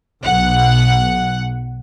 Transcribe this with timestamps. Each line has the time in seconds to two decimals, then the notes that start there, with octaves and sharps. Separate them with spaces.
0.23 B1 F#5